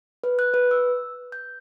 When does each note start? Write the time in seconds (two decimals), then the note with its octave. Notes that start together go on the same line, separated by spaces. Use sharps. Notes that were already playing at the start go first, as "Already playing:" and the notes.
0.24 B4
0.39 F#6
0.54 B4
0.71 E6
1.32 G6